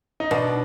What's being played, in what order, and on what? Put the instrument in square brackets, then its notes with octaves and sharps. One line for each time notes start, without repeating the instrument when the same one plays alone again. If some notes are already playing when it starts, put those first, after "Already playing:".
[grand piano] D#4
[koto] B2 [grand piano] D4